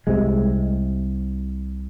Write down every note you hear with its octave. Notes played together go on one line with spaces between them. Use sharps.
C2 C3 G#3